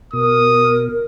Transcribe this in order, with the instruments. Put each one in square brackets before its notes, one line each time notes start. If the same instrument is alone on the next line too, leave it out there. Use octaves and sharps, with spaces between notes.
[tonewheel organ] B2 [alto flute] A#4 [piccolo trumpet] D#6